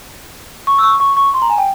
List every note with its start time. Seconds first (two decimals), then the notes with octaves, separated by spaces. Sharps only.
0.67 C#6
0.78 E6
0.83 C#6
1.00 C#6
1.17 C#6
1.34 C6
1.42 A#5
1.49 G#5
1.58 G5